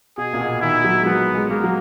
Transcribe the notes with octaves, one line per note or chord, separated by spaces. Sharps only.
B2 G#4
A#2
B2
D#3 E4
F#3
G#3
F#3 B3
G#3
G#3 A#3
F#3